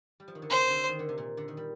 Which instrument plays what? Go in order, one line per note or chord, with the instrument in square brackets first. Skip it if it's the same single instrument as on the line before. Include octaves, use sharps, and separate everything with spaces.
[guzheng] G3
F3
D#3
D3
[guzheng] C3 [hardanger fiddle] C5
[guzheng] D3
D#3
D3
C3
A#2
D3
D#3
G3